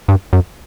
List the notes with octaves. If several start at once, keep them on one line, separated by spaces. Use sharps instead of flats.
G2
F#2